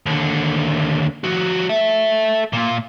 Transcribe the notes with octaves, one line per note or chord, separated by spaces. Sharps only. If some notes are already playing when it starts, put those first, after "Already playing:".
D#2 D3
F3 F#4
A4 E5
A#2 F4